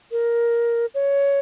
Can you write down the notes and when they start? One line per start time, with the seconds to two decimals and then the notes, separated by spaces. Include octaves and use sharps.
0.12 A#4
0.94 C#5